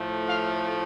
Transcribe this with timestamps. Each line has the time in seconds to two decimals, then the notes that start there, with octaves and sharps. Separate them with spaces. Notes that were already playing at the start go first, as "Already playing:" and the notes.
Already playing: A2 F3 A3
0.26 F5